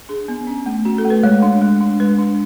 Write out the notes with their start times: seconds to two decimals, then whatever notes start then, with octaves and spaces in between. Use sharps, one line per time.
0.09 D4 G#4
0.28 B3
0.47 C#4
0.66 A3
0.85 C#4 F#4
0.98 A4
1.05 A3
1.10 B4
1.23 G#3 C#5
1.42 D4
1.62 G#3
1.81 D4
2.00 G#3 B4
2.19 D4